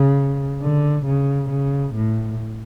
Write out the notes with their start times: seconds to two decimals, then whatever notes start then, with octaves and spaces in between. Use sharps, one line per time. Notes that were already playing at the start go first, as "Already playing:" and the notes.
Already playing: C#3
0.62 D3
1.06 C#3
1.50 C#3
1.95 A2